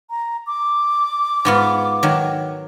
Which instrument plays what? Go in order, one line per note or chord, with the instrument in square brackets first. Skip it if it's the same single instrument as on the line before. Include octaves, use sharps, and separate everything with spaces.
[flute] A#5
D6
[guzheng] G#2 B3 F4
D#3 F#3